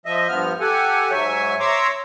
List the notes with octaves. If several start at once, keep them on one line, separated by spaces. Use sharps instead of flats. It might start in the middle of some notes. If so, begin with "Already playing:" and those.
F3 D#5 E5
G2 F3 B3 F6
G4 A4 F#5 G#5
G#2 F#3 C#5 E5 G#5
C#5 E5 A#5 C6 D6 E6